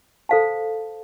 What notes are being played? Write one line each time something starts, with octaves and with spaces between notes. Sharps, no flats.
A4 C5 F5 A5